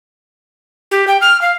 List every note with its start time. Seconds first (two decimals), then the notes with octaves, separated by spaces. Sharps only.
0.91 G4
1.08 G5
1.21 F6
1.41 F5